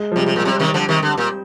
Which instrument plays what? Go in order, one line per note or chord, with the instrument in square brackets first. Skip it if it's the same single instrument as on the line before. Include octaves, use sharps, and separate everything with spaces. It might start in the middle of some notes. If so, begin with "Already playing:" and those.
Already playing: [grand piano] G#3
F3
[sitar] C3 [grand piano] G3
[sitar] C3
A#2
[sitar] C3 [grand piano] G3
[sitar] C3 D#3
D3 F3
C3 D#3
D3
A#2